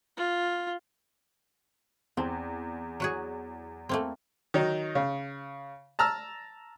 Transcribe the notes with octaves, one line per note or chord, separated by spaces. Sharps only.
F4
E2 C4
F#3 F#4 G#4
A3 A#3 C4
D#3 F#3 D#4
C#3
A5 A#5 E6 F6